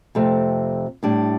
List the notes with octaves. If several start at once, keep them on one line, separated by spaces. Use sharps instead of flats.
F2 C3 A3 C4
A2 G3 D4